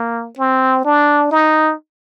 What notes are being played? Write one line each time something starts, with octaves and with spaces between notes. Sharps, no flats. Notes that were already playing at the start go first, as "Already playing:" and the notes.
Already playing: A#3
C4
D4
D#4